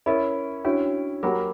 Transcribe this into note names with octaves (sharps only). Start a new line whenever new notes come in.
C#4 E4 A#4 E5 B5
C#4 D4 E4 F#4 C#5 G5
F#3 A#3 G4 C#5 G5 B5 D6